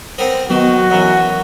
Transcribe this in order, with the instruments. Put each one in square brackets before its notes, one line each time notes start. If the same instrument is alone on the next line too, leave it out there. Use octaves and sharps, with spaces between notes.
[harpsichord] B3 C4 A#4
[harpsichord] D#3 [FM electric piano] F#3 B3 [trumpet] F#4
[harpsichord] F#2 E3 [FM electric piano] F#5 A#5